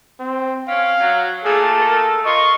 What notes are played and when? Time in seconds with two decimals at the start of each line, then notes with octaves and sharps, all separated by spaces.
0.20 C4
0.68 C4 C#4 F5
1.00 F#3
1.44 A#2 D#3 A3 G#4 A4
1.79 A#4
2.25 F4 D#5 C#6